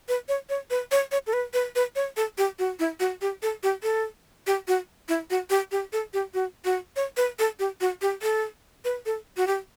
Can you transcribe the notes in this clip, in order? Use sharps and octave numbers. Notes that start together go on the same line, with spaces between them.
B4
C#5
C#5
B4
C#5
C#5
A4
B4
B4
B4
C#5
A4
G4
F#4
E4
F#4
G4
A4
G4
A4
G4
F#4
E4
F#4
G4
G4
A4
G4
F#4
F#4
C#5
B4
A4
G4
F#4
G4
A4
B4
A4
F#4
G4